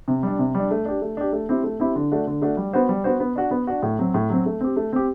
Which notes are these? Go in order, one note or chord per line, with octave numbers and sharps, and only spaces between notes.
C3
G3 D4
C3
G3
D4
A3
D4 G4
A3
D4 G4
A3
C4 E4 G4
A3
C4 E4 G4
D3
A3 D4 F#4
D3
A3 D4 F#4
G3
B3 F#4 C5
G3
B3 F#4 C5
B3
D4 F#4
B3
D4 F#4
A2
F#3 C4
A2
F#3 C4
A3
C4 G4
A3
C4 G4